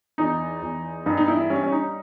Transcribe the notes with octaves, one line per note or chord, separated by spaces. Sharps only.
E2 D#4
E2
G2 D#4
D#4
E4
G3 C#4
C#4
D#4